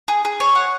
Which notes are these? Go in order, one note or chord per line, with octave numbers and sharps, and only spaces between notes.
G#4
G#4
C#5
F#5